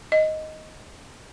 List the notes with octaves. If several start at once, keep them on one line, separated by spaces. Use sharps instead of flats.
D#5